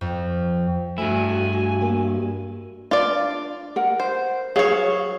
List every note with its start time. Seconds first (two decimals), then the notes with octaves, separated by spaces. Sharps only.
0.01 F2
0.98 G2 A3 E4 F#4 G#5
1.81 A#3 G4
2.91 D4 F4 D5
3.76 A#4 F#5
4.00 C5
4.56 F#3 G#4 C#5 F5